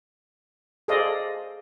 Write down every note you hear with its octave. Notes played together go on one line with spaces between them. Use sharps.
G#4 A4 C5 D5 D#5 F5